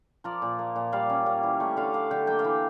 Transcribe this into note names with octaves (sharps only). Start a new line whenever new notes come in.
F3 A#4 D5
A#2
A#3
A#2
G3 D5 F5
C#4
A#3
E3
A3 C#5 E5
D3 D5 F5
D4 D5 F5
D3 E5 G5
A#3 E5 G5
D5 F5
E3